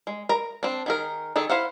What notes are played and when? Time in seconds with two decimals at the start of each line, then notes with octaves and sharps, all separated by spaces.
0.07 G#3
0.29 A#4 A#5
0.63 C4 D4
0.86 D#3 G#4 A#4
1.36 D#3 G#4 A4
1.50 E4 C5 F5 F#5